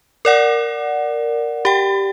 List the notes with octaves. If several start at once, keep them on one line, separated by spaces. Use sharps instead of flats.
A#4 D5 F#5
G4 G5